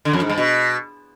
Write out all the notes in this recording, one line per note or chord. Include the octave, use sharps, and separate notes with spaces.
D3
F2
G#2
G2
B2